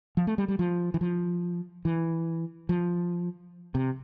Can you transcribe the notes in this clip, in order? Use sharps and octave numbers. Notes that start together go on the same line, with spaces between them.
F3
A3
G3
G3
F3
E3
F3
E3
F3
C3